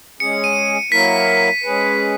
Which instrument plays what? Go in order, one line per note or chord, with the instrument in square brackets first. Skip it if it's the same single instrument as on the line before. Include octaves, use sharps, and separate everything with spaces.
[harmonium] G#3 C#4 G#4 [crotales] C#7
[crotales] D#7
[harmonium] F#3 A#3 E4 A#4 [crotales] B6
[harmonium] G#3 C#4 G#4 B4